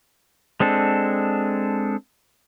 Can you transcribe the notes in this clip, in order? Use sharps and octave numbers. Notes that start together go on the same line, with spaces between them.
G#3 C4 D4 A4